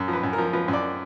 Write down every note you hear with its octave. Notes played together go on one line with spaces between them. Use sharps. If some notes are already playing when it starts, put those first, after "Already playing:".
Already playing: F#2
F3
B4
F#2
A#4
F3
F3 B4
F#2
D5